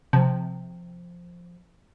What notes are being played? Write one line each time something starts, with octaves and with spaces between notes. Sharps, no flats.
C3 F3